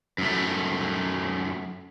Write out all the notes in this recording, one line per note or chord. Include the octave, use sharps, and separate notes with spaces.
F#2 A3